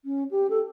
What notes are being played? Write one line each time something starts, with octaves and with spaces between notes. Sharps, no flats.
C#4
G4
A4